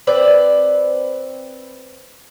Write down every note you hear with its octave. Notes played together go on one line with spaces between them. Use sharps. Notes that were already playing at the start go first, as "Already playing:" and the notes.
C4 B4 D5